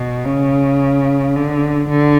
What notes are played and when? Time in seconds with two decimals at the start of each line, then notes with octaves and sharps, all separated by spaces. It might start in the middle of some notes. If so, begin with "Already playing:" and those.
Already playing: B2
0.26 C#3
1.35 D3
1.89 D3